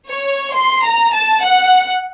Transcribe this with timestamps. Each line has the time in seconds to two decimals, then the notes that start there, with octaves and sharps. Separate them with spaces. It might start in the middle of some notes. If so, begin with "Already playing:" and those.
0.10 C#5
0.54 C6
0.84 A#5
1.14 A5
1.43 F#5